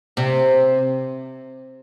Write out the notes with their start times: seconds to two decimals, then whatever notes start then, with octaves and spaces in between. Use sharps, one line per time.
0.17 C3